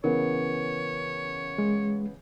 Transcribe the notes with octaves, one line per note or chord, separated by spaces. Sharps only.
C#3 E3 B3 A#4 C#5
G#3